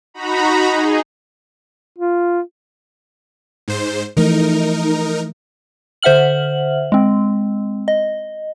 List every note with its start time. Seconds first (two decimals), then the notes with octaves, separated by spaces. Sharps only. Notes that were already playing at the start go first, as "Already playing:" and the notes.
0.14 D#4 F#4 A#5 B5
0.71 D#4 G#4
1.99 F4
3.68 G#2 C5
4.17 E3 F3 A3 D#4 A#4
6.03 D3 C5 E5 F#5 F6 F#7
6.92 G#3 C4
7.88 D#5